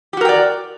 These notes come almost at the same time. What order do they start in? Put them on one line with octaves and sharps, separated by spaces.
G4 F#4 A#4 G5 D5